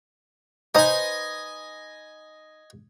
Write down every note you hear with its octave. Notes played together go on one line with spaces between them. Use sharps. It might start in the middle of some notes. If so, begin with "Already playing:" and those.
D#4 B4 C5 D#5 G#5